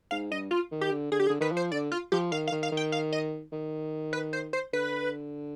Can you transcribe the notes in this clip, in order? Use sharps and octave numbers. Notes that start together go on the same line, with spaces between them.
G#2 F5
G2 D#5
F4
D#3
G4
D3
D3 G#4
G4
G#4
D3
D#3 B4
F3
C5
D3 D5
F4
F3 G4
D#3 F5
F5
D#3
F5
D#3
G5
F5
D#5
D#3
B4
C5
C5
D3 B4